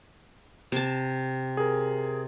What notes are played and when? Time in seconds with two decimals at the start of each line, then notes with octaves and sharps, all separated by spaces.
0.72 C3 A5
1.57 G#4 A#4